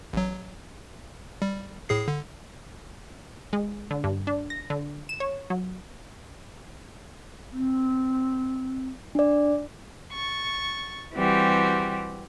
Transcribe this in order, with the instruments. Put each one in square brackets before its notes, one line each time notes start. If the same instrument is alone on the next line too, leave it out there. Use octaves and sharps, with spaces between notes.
[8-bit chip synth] A1 F#3
G3
A2 G#4 C7
D3
[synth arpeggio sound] G#3
D3
G2
D4
A#6
D3
E7
C#5
F#3
[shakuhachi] C4
[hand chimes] D4 D5
[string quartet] C#6 A6
E3 G3 C4 F#4 G4